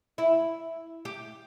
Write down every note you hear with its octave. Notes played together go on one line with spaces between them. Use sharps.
E4
G4